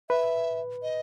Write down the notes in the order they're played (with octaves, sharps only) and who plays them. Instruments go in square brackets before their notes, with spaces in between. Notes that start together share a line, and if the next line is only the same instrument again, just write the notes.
[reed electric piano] B4 [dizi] E5
[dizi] D#5